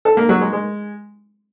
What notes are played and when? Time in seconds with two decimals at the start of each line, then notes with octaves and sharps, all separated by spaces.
0.05 A4
0.17 A#3
0.29 F#3
0.41 G#3
0.53 G#3